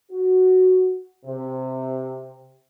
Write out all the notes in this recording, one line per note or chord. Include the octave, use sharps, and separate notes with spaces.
F#4
C3